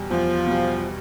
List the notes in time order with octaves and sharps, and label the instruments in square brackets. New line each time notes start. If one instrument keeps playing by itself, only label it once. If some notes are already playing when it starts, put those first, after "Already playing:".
Already playing: [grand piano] E2 B2 G3
[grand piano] E2 [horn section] F3
[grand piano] B2 G3